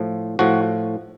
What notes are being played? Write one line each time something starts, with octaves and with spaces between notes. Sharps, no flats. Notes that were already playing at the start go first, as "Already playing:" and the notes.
Already playing: A2 F3
A2 F3 F#4